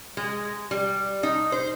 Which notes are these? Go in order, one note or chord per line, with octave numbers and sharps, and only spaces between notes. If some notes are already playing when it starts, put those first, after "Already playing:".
G#3
G3
D#4
C5